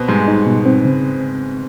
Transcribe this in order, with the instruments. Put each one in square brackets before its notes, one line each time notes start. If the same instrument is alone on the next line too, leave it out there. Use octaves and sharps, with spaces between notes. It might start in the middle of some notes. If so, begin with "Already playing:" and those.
Already playing: [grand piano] B2 B3 C4
[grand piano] G#2 G#3 [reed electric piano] G3
[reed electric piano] D#4
B2
C4
C#3